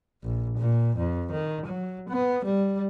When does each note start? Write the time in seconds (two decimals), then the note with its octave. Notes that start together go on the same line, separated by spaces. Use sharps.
0.23 A#1
0.58 A#2
0.97 F2
1.32 D#3
1.66 F#3
2.09 B3
2.45 G3